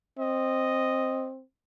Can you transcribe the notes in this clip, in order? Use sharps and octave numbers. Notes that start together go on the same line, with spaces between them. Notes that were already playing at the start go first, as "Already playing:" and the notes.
C4 D#5